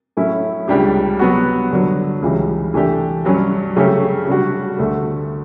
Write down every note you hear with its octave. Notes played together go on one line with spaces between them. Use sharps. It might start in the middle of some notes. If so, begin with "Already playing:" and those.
A2 F#3 A3 C#4 E4
C#2 C#3 G3 D4 G4
F#3 B3 F#4
G2 D3 F#3
C#2 C#3 E3 G3
E3 A3 D4 G4
G2 F#3 C#4
C#3 F#3 A3 C#4 G4
C#3 G3 D4 F#4
D2 D3 A3